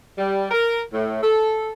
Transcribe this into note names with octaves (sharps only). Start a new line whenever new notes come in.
G3
A#4
A2
A4